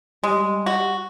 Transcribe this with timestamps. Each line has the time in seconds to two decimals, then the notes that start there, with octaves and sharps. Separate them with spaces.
0.24 G3 G#3
0.66 F#4